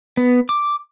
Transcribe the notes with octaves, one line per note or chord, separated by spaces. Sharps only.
B3
D6